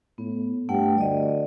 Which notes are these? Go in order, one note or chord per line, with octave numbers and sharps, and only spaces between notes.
A2 B3
G2 A3 F#5 G5
D2 D5 D#5